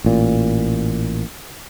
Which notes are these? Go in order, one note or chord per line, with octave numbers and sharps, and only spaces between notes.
A1 A#2